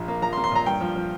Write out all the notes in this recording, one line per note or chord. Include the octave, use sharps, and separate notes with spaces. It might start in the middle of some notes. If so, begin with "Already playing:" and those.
Already playing: A#1 F3
A#3
F3 A#5
C6
A#3
C6
A#2 A#5
G2 G5
F3
F3